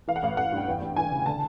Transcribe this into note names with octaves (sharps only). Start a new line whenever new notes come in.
E3 F5
F#5
A1 F5
A1 F#5
G2
G5
E2
E2
E3 G#5
C#3
D3 A5